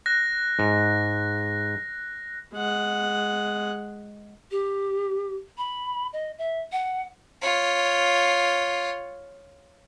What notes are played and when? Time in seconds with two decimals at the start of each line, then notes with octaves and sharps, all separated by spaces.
0.06 F#6 A#6
0.59 G#2
2.54 G#3 F#5
4.51 G4
5.58 B5
6.13 D#5
6.38 E5
6.72 F#5
7.41 F4 C#5